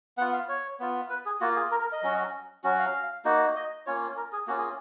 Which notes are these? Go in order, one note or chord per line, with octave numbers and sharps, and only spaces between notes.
B3 F4 F#5
F5
C#5
B3 F4
B4
G#4
A#3 F4 F#4
G#4
A#4
A#4
D#5
F#3 C#4 F#4
F#3 C#4 F#4
F5
A#3 D#4 F#4
D#5
A#3 C#4 F4 C#5
A#4
G#4
A#3 C#4 F4 F#4
G#4